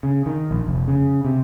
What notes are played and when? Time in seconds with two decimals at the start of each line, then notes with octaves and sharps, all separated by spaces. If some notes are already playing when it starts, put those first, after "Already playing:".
0.03 C#3
0.26 D#3
0.51 A#1
0.67 F1
0.87 C#3
1.25 C3